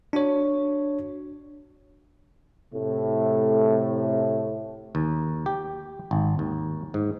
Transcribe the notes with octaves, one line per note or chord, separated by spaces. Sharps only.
D4 F#4 C#5
A2 C3 A3
D#2
G4
G#1
D#2
G#2